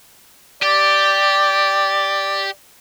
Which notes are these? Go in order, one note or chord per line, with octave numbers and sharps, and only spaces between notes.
G4 D5